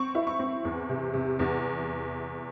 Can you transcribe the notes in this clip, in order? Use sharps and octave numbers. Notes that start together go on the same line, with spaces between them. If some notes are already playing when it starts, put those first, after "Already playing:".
Already playing: C4 C#6
E4
C#6
C4
E2
C3
C3
E2